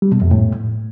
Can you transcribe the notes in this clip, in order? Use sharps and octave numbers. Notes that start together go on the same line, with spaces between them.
G3
B2
F2
A2